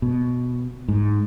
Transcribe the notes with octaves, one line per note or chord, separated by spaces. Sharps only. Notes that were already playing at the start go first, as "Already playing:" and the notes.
B2
G#2